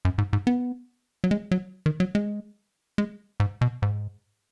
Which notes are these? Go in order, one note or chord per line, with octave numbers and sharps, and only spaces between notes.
F#2
G#2
G#2
B3
F#3
G#3
F#3
D#3
F#3
G#3
G#3
G#2
B2
G#2